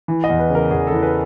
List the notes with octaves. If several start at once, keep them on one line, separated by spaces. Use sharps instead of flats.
E3
D#5
E2
B4
C#3 A#4
E2 G#4
A4
E3
B4